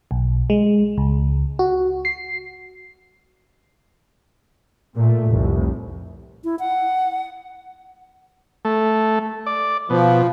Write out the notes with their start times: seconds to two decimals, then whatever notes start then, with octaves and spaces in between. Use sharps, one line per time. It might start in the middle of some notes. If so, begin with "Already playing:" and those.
0.11 B1
0.50 G#3
0.98 C#2
1.59 F#4
2.05 C7
4.96 A#2 A3
5.29 F1 C2
6.44 E4
6.59 F#5
8.65 A3
9.46 D5
9.90 B2 F3